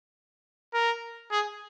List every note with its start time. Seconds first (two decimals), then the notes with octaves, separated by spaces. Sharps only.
0.74 A#4
1.31 G#4